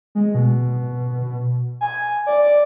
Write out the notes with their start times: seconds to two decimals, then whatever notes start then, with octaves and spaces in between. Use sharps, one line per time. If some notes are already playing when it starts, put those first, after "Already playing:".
0.15 G#3
0.35 B2
1.81 G#5
2.27 D5